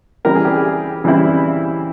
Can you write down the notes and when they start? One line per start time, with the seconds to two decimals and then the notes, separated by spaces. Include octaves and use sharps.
0.25 C#3 E3 G3 C4 E4 A#4
0.35 G#4
0.45 G4
0.56 G#4
1.04 C#3 E3 G3 C4 E4